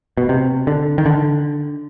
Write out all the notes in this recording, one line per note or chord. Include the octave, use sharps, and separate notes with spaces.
B2
C3
D3
D#3
D3